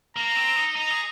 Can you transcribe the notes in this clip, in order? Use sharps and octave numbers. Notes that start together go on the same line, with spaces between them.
A#3 A#5
C4
D#4
D#4 A#5
G#4